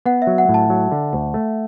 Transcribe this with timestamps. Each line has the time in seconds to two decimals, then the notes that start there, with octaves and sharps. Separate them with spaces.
0.06 B3 F#5
0.22 E5
0.27 F#3
0.38 F#5
0.49 A2
0.54 A5
0.70 F#3
0.92 D3
1.13 D2
1.34 A3